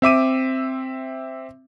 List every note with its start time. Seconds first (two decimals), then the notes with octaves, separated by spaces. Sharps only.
0.02 C4 E5 D6 D#7